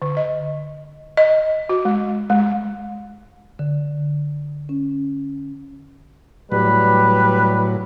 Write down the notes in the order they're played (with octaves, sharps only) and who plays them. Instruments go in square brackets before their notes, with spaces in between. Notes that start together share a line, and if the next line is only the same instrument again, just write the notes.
[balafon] D3
D#5
D#5
F#4
G#3
G#3
[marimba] D3
C#4
[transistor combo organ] A2 F#3 [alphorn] G3 [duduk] B4